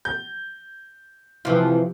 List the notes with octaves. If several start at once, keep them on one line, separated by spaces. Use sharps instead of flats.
G6
C3 E3 F3 F4